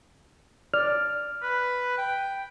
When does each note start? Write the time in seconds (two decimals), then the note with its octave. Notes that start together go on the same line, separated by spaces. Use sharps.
0.74 D5 F6
1.42 B4
1.98 G5